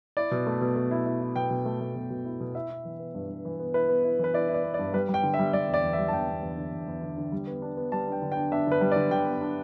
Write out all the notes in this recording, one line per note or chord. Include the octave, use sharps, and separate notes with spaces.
E4 D5
B2
A3
B2
A3
E4
E4
E4
B2 G5
B2
A3
A3
B2
B2
E4
B2
E4 E5
E4
E3
B3
G2
G2
E3
B3
E4 B4
B3
E4
E3 B4
E4 D5
E4
D5
B3
D5
G2
G3 B4
G3
G5
D3
E5
G3
G3 D5
E2
D5
E2
E5
G3
A5
E2 G5
E2
E2
D3
E2
E2
D3
D3
G3
B3
D4
B3
G3 A5
D4 G5
D3
G5
D4
D4 E5
D3 B4
G3
D5
D3
D3 G5
B3
D4